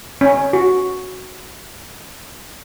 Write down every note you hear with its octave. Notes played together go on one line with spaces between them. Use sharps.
C#4
F#4